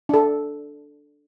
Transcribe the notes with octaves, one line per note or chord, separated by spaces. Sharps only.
D4 A4